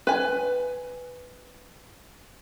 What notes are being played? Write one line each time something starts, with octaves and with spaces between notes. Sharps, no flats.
B4 G#5